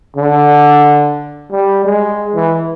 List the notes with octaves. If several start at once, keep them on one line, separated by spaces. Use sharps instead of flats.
D3
G3
G#3
E3